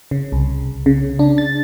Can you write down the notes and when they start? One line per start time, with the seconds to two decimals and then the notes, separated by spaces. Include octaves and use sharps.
0.11 C#3
0.32 C2
0.86 C#3
1.19 D4
1.38 A6